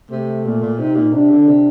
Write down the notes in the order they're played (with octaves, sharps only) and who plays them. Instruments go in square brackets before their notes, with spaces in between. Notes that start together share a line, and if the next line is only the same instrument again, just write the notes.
[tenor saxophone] C3 [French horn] A3
[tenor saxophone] A#2
A#2
[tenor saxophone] C3 [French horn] D#4
[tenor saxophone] A#2
[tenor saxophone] C3 [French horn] D4
[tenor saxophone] D3
C3